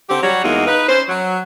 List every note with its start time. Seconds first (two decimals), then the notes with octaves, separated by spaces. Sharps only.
0.09 D3 C4 G4
0.23 F#3 G3 F#4 C#5
0.44 E2 G#3 A#3 D#4 F#4
0.67 D#4 B4
0.89 C#4 C5
1.09 F#3